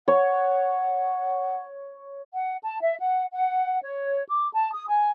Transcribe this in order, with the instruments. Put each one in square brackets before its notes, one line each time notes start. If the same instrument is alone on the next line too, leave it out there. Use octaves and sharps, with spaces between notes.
[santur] C#5 [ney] F#5
[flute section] F#5
A5
E5
F#5
F#5
C#5
D6
A5
D#6
G#5